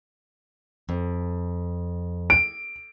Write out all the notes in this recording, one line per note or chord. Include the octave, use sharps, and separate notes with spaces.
F2
D7